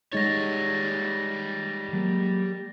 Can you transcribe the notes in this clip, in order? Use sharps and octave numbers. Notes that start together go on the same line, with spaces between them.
G3 G#3 D#4 C#5 A6 A#6
F#3 G#3 A#3